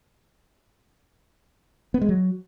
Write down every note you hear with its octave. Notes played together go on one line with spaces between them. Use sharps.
B3
G#3
F#3